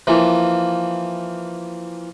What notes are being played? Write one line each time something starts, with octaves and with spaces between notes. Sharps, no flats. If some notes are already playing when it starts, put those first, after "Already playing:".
E3 F3 A#3